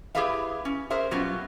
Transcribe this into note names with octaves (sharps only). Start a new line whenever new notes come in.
E4 G4 G#4 B4 E5 F5
C#4
G#4 A#4 C5 E5
B2 F#3 G3 B3 C#4 F4